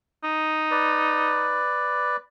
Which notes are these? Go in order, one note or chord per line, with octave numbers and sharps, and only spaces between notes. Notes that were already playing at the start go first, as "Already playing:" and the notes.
D#4
B4 D5